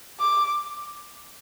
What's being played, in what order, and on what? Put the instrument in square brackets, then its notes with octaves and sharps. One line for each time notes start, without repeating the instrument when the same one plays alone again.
[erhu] D6